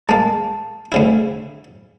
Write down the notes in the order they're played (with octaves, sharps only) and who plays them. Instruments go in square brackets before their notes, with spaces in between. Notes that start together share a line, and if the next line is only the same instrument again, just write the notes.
[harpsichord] G#3 A#3 [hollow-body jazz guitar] A5
[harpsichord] D2 C#3 E4